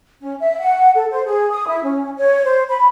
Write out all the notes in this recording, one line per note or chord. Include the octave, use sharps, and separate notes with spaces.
C#4
E5
F#5
A4
C5
G#4
D#6
E4
C#4
C#5
C5
B5